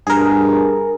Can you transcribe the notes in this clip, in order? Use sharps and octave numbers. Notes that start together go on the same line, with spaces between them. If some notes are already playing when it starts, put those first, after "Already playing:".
G2 G#4 A#4